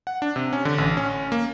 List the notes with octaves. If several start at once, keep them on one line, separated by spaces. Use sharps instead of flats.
F#5
D4
C3
C#4
D3
A1
C#4
A#3